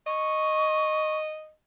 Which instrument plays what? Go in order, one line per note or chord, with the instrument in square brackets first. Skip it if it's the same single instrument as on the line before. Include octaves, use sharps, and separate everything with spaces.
[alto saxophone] D#5 [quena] C#6